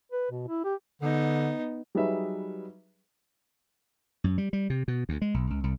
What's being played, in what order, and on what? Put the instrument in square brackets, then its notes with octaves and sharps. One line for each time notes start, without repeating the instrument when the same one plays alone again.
[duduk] B4
B2
E4
G4
[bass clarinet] D3 [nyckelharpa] B3 D#4
[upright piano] F#3 G3 D#4 G#4 B4 E5
[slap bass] F#2
G3
G3
C3
B2
D2
G#3
B1
C#2
C2